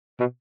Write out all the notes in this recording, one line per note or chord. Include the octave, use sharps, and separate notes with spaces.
B2